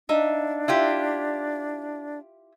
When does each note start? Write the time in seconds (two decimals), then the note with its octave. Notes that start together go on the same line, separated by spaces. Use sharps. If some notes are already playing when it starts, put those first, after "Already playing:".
0.09 D4 D#4 E5 F5
0.68 E4 F4 G4